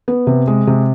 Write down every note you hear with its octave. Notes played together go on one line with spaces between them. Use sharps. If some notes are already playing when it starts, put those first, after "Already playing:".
B3
C3
G#3
C3